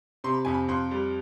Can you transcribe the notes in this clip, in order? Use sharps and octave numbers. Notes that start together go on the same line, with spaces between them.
C3 C6
B5
F2 G#5
B5
F2 C6
G3